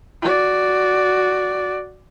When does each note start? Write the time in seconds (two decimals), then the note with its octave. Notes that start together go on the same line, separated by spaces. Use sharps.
0.22 F#4 D5